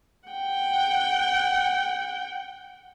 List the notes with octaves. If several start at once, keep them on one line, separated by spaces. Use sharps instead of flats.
F#5 G5